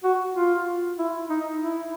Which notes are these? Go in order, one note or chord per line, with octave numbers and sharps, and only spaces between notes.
F#4
F4
E4
D#4
E4